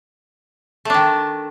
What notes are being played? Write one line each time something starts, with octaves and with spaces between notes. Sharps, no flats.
D#3 A3 D4